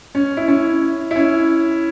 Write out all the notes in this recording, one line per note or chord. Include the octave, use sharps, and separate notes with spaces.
C#4
E4
C#4
E4
C#4